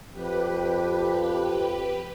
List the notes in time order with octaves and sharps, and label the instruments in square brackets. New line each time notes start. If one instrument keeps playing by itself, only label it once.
[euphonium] F2 [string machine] G4 B4